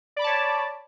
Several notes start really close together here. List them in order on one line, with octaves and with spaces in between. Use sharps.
D5 B5 D6 A5 C#5